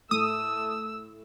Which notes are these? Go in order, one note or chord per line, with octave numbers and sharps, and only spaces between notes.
A2 A3 D#6 E6